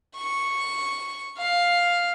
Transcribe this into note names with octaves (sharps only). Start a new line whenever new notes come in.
C#6
F5